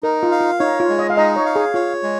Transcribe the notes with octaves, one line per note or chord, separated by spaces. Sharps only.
D#4 A#4
F4
F5
F4
D#4 C#5
F4
G#3
D#5
F5
D#4 D#5
C#5
F5
G#4
F4 C#5
G#3